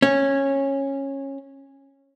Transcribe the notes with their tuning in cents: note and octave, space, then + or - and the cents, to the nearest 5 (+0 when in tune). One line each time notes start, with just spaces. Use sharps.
C#4 -15